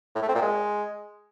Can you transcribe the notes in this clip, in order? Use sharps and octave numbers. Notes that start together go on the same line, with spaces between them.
A2
A3
C4
A#2
G#3